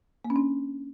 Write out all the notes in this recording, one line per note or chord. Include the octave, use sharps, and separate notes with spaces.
A#3
C#4
D4